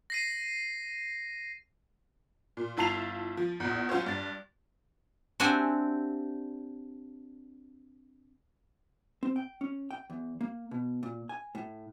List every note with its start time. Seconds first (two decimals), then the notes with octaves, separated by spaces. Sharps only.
0.10 A#6 C7 D#7
2.57 A#2
2.77 G1 E4 F4 A5 C7 F7
3.37 F3
3.60 A#1 E2
3.89 F#3 C#4 F4 F#4 C5 C#5
4.06 G2 A6
5.40 C4 D4 F#4 G4 E5 G#5
9.23 C4
9.36 G5
9.61 C#4
9.91 G5
10.10 E2
10.41 A#3
10.71 B2
11.03 A#2
11.29 G#5
11.55 A2